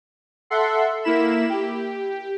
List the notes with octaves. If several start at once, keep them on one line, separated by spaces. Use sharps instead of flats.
A4 E5 F#5 C6
A#3 E4 B5 E7
G4